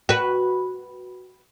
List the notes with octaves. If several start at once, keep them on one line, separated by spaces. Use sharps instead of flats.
F#4 B4